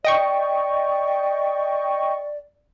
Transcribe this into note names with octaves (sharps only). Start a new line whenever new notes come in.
D5 D#5 G5 C#6